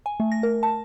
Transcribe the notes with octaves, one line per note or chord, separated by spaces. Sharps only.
G#5
A3
A#6
A#4
A5